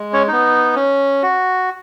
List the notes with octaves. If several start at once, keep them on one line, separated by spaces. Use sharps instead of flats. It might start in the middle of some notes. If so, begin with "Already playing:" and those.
Already playing: G#3
C#4 C#5
B3 D#4
C#4
F#4